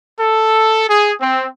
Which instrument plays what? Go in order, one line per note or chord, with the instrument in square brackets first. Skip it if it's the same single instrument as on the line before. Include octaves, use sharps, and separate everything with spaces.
[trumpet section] A4
G#4
C4